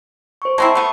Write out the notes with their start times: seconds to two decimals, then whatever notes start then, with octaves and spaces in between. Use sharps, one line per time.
0.42 C5 C#6
0.58 G#3 C4 E4 A5 C7
0.75 A3 B3